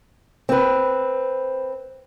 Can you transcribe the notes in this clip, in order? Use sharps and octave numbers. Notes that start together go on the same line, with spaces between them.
C4 B4